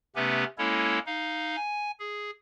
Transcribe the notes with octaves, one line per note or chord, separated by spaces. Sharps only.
C3 A3 B3 C#4 G4 B4
G#3 A#3 C#4 E4 A4 C#5
D#4 F5
G#5
G#4